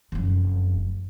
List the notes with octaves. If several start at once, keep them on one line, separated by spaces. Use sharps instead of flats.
F1 F#2